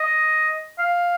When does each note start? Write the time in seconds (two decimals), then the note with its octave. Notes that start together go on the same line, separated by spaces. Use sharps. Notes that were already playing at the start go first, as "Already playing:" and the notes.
Already playing: D#5
0.79 F5